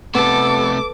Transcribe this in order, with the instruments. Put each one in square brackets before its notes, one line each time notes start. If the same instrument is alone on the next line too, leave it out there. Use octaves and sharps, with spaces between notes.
[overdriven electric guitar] C3 A3 [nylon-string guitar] B3 [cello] A4 [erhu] D6